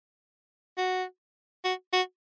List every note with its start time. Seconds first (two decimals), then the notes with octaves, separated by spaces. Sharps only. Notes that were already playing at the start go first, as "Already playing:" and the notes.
0.78 F#4
1.65 F#4
1.93 F#4